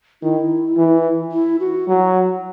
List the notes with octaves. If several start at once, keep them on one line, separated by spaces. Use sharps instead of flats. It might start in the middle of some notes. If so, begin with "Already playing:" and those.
D#3 E4
E3
E4
F#4
F#3